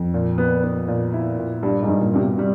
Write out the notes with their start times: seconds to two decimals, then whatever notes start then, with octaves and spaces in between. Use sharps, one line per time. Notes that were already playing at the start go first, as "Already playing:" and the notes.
Already playing: F2
0.14 A#2
0.38 B3
0.64 B3
0.88 A#2
1.13 E4
1.39 A#2
1.63 G2 G3
1.82 G#2
1.88 G2
2.01 A#2
2.13 G2 C3
2.20 B2
2.38 C3 G3